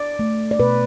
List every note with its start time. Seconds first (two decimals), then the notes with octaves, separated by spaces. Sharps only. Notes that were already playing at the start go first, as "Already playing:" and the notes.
Already playing: D5
0.19 A3
0.51 D5
0.60 B2 B4